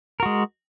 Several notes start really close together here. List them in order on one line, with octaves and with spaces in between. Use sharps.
A#4 F#4 G#3